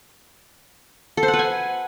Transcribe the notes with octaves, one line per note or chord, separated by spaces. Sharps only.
A4
C5
F#5
B4
G#5